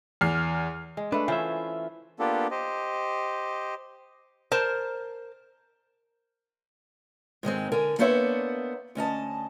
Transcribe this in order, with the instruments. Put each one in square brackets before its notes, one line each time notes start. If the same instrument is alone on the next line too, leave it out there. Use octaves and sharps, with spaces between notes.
[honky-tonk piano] E2 F6 C7
[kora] G#3
[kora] A3 B4 [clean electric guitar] D4
[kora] E3 C#4 C5 [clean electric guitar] F4 E5
[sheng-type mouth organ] A#3 B3 D4 F4 G4 A4
G4 C5 D#5
[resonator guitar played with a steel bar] A#4 C5 A5
[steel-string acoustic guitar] G#2 D#3 G#3 C4
D3 A#4 G#5
A#3 B3 D4 C5 C#5 E5
D2 C#4 D#5 A5